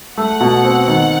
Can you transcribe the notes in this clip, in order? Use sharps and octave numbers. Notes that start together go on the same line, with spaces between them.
A3 F#5
B2
C4
D#3